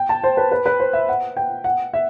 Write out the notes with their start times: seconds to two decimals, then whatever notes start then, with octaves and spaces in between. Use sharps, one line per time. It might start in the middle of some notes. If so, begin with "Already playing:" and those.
Already playing: G5
0.09 A5
0.24 C5
0.37 B4
0.52 B4
0.66 B4
0.80 C5
0.93 E5
1.09 F#5
1.37 G5
1.64 F#5
1.93 E5